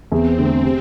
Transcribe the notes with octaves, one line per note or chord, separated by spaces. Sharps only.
E2 C4
D3 A3
C3